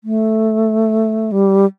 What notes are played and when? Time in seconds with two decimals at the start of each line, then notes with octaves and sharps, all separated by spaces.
0.04 A3
1.32 G3